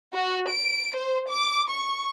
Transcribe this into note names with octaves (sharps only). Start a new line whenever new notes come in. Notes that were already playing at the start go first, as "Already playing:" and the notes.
F#4
D7
C5
D6
C#6